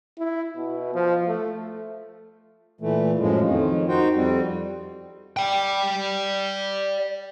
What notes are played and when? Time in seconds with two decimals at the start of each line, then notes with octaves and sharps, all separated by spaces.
0.19 E4
0.57 B2
0.94 F3
1.28 A3
2.81 A#2 E3 A3
3.19 F#2 A2 F3 G#3
3.41 F2 D#3
3.88 D#4 F#4 C5 G5
4.16 F2 G3 C4
5.37 D5 G5